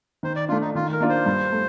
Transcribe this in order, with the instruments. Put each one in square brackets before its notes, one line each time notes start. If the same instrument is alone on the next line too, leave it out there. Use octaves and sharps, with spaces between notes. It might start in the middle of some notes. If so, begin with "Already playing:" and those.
[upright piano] D#3 [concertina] C5
[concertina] D5
[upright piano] A3 D4 [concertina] F4
[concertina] D#4
[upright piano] D#3 [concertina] F4
[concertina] A#4
[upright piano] A#3 D4 F4
[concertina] C5
[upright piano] G2
A3